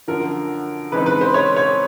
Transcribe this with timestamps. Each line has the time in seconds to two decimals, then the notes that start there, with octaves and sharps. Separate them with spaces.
0.08 F#2 D3 F3 A#4
0.92 C#3 E3 G#3 C4 D#4 B4
1.06 B4
1.21 C5
1.34 C#5
1.56 C#5